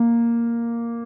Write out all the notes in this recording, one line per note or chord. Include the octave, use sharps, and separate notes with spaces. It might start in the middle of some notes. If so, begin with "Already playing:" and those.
Already playing: A#3